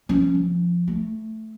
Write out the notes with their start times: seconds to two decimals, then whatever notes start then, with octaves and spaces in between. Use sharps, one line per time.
0.09 F3 C#4
0.35 F3
0.88 A3